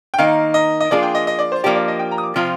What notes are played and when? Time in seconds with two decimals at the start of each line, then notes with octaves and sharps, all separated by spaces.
0.14 G5
0.18 D#3 A#3 D#4 F5
0.54 D#5
0.80 D#5
0.91 F3 A#3 D4 F4 G#4 D5
1.03 G5
1.15 D#5
1.27 D#5
1.39 D5
1.52 C5
1.63 F3 A#3 D4 G4 D5
1.75 D5
1.88 D#5
1.99 G5
2.11 A#5
2.18 D#6
2.24 D6
2.36 C3 F3 C4 F4 F6